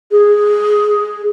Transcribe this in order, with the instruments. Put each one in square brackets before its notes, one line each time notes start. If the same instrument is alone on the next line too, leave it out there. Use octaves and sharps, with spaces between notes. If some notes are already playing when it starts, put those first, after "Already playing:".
[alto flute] G#4